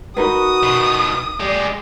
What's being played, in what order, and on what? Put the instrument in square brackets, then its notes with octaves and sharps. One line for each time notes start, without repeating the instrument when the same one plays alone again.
[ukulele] D#4 A#4 B4 [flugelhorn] F#4 [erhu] D#6
[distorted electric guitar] B2 D#3
[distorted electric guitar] G#3 G4 [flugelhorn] D5